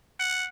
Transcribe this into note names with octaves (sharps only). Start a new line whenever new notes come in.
F#5